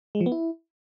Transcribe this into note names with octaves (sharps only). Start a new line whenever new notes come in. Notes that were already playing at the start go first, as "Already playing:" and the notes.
G#3
F3
B3
E4